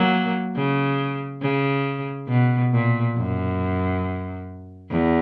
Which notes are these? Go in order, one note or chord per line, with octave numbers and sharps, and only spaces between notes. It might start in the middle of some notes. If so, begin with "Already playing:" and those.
Already playing: F#3 A#3
C#3
C#3
B2
A#2
F#2
E2